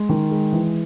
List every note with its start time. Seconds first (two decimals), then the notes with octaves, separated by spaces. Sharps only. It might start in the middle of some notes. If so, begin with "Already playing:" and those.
Already playing: G#3
0.09 D#3
0.31 G#3
0.52 E3